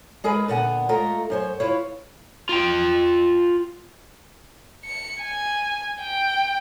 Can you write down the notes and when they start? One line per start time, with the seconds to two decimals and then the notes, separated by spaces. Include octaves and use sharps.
0.24 G#3 G#4 A#4 B4
0.48 A#2 D3 B3 F#5 G#5
0.89 G#3 A3 F4 A#4
1.30 F#2 C5 C#5
1.60 E4 F4 B4 C#5
2.49 F4 G5
4.84 C#7
5.22 G#5
6.00 G5